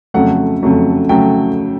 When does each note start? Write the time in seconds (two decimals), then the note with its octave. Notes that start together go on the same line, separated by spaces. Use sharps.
0.14 F2 C#3 F#3 A3 F#5
0.63 F2 C#3 F#3 A3
1.09 C#3 F#3 A3 G5